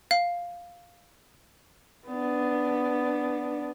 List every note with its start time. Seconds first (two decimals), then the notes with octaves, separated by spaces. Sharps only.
0.11 F5
2.08 B3 D4